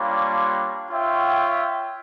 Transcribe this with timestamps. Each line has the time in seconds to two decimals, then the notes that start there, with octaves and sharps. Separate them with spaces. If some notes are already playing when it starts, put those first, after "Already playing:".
Already playing: G3 A#3 D4 F4 C#5
0.89 F4 C#5 E5 G5